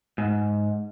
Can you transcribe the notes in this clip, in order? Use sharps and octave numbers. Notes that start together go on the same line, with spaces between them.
G#2